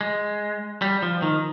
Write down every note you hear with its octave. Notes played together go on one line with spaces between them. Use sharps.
G#3
G3
F3
D#3